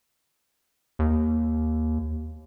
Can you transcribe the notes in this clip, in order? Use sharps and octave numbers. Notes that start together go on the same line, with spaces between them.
D#2